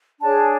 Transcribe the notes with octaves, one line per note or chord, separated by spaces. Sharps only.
D4 G#4 C#5 A5